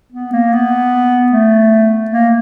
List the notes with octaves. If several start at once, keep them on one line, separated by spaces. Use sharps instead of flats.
B3
A#3
B3
A3
A#3